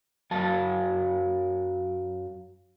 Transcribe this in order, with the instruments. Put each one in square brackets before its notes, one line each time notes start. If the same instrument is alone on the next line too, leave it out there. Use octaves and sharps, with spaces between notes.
[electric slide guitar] F#2 F#3 A#4 F5 A5